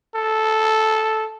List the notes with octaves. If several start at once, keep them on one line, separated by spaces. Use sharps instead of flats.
A4